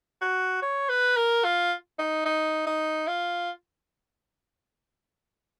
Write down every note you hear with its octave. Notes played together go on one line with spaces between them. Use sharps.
F#4
C#5
B4
A#4
F4
D#4
D#4
D#4
F4